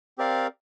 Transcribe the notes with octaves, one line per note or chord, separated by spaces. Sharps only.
C4 G4 A#4 D5 F5